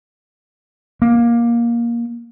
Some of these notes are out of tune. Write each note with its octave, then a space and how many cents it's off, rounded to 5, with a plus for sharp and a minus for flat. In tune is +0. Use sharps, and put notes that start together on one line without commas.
A#3 +15